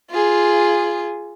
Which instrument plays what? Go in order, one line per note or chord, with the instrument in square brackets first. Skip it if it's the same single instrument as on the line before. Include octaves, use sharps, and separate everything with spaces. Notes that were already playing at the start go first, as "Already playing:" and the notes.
[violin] F4 G#4